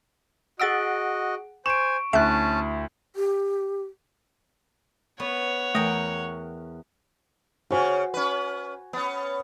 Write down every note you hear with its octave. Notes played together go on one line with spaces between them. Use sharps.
F#4 G#4 D#5 F#5 D#6 E6 A6 D7
C5 G#5 C#6 D7 E7
D2 C#4 E4 E5 A5 F#6
G4
B3 C#5 F#5
E2 A3 A#4 G5 D#6 A#6
C#3 C#4 F#4 C5 G#5
C#4 B4
B3 C#4